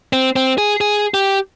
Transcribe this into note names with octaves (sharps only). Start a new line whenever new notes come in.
C4
C4
G#4
G#4
G4